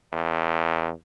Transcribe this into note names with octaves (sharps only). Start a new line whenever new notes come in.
E2